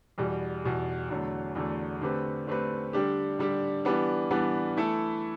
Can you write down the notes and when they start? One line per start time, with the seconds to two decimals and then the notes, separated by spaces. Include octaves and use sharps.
0.18 E2 B2 G3
0.64 E2 B2 G3
1.09 E2 D3 F#3 A3
1.55 E2 D3 F#3 A3
2.01 D3 A3 C4 G4 B4
2.47 D3 A3 C4 G4 B4
2.93 D3 G3 D4 G4
3.39 D3 G3 D4 G4
3.85 E3 G3 B3 D4
4.31 E3 G3 B3 D4
4.77 E3 A3 E4 A4